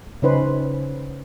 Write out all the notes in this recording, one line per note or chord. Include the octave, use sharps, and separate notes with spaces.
C#3 C#4 D#4 B4 C5